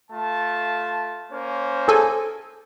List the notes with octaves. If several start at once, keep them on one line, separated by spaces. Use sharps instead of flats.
A3 F4 A5
A#3 C#4 C5
G#4 A4 G#5